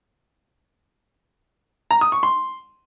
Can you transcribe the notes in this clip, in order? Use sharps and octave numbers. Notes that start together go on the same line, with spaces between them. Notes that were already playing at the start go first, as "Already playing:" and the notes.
A#5
D#6
C#6
C6